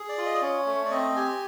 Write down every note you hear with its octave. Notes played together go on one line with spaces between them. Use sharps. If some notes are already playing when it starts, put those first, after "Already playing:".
Already playing: G#4
D5
F4
D#5
D5
C#4 C#5
A3
D5
C4 D#5
G4 G#5